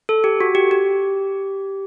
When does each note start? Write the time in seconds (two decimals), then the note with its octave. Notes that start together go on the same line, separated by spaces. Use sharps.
0.09 A4
0.24 G4
0.40 F#4
0.55 G4
0.71 G4